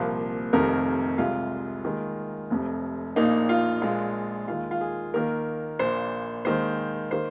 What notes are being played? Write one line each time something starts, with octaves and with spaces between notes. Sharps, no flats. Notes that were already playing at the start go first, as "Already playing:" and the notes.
Already playing: C2 A#2 F3 A#3
F1 F2 C3 D#3 A#4
C2 C3 G#3 F4
D#2 D#3 G#3
F1 F2 C3
A#1 A#2 A#3 D#4
F4
A#1 A#2 G#3 F4
D#2 D#3 G#3 F4
F4
G#4
D#2 D#3 A#3 A#4
A#1 A#2 A#3 C5
D#2 D#3 G#3 C5
D#3 A#3 C5